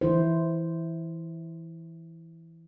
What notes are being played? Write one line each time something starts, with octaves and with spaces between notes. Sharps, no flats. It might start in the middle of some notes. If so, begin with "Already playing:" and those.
E3 E4 C5